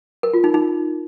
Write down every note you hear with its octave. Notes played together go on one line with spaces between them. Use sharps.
A#4
F4
D#4
D#4